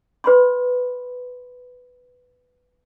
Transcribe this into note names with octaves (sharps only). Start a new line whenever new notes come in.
B4 B5 C6